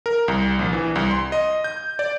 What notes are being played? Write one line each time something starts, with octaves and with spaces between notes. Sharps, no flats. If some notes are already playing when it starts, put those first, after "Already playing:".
A#4
C2
A#1
E3
C2
C6
D#5
G6
D5